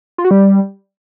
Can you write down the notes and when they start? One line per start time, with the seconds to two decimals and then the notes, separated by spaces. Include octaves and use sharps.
0.18 F4
0.25 F#4
0.31 G3